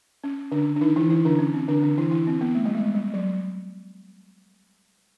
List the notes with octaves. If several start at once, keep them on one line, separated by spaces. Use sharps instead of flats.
C#4
D3 D4
D4
D#3 D#4
E3 E4
E3 E4
D3 D4
C#4
C4
D3 D4
D3 D4
E3 E4
E3 E4
C4
B3
A3
G3
G#3
G3
F#3